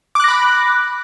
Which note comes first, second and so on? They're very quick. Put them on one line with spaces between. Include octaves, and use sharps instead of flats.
D6 F#6 A#6 B5